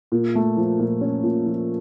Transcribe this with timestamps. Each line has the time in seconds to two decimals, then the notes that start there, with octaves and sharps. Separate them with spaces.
0.12 A#2
0.35 A3
0.57 F3
0.79 A#2
1.01 C#4
1.24 A#2
1.46 F3